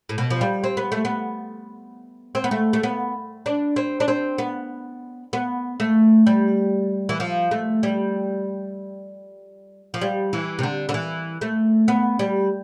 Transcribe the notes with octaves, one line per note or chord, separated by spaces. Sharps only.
A2
B2
F3
G3
C4
B3
A3
B3
C4
B3
A3
A3
B3
D4
C4
D4
C4
B3
B3
A3
G3
E3
F3
A3
G3
F3
G3
E3
C3
D3
D3
E3
A3
B3
G3